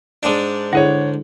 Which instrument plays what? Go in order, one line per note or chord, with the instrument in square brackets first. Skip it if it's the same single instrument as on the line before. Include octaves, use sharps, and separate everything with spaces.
[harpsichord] G#2 D4
[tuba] D3 [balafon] E4 G#4 [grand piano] C#5 F#5